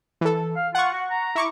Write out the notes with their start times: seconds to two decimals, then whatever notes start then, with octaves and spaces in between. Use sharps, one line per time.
0.21 E3 A4
0.56 F5
0.75 F4 F#5 C#6
0.92 F#4
1.11 A#5
1.35 E4 C#6 D6